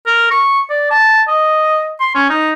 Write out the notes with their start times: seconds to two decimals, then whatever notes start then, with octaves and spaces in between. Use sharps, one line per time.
0.07 A#4
0.31 C#6
0.70 D5
0.91 A5
1.28 D#5
2.00 C6
2.15 C#4
2.30 D#4